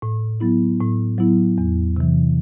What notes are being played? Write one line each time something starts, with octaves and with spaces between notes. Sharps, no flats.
A2
F#3 B3 E4
A2
F#3 B3 E4
E2
C3 E3